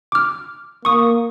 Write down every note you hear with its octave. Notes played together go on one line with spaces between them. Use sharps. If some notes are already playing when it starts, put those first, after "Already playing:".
D6 F6
A#3 C#6 D#6